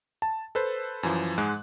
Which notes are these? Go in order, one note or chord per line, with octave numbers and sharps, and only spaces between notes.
A5
A4 B4 C5
F#2 E3 F3
G#2 G#3 F#6